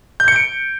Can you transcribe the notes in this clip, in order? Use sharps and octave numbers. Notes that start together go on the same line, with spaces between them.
G6
C#7
D7